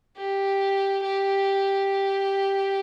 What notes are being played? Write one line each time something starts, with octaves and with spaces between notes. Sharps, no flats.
G4
G4